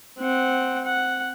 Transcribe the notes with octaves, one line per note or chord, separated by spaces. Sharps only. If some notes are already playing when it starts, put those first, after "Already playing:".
C4 F#5
F#5